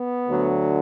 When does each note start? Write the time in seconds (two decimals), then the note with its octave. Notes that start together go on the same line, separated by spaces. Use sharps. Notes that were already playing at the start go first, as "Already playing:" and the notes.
Already playing: B3
0.27 D2 D3 F#3